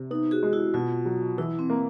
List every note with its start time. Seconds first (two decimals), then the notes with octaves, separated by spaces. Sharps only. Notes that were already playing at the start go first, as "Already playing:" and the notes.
Already playing: C3
0.11 B3 D#4
0.31 F#4 G#4
0.43 G#3
0.53 E4 F#4
0.74 B2 F4
1.05 F#3
1.38 E3 E4
1.59 C4
1.70 A#3